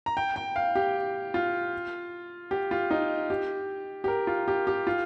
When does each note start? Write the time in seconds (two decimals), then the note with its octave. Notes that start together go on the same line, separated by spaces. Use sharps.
0.06 A#5
0.17 G5
0.36 G5
0.56 F5
0.75 G4
1.34 F4
2.51 G4
2.71 F4
2.91 D#4
3.30 G4
4.04 G4
4.08 A#4
4.27 F4
4.48 G4
4.67 G4
4.87 F4